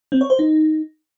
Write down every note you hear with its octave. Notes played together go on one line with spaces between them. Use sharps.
C4
C#5
C5
D#4